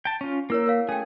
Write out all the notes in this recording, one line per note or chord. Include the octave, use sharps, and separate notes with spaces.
G5 A5
C#4 F4
A#3 E4 A#4 C#5 E6
A#4 C#5 F5
A3 C#4 G#4 G5 G#5